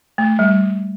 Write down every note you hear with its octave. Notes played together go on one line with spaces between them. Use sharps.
A3
G3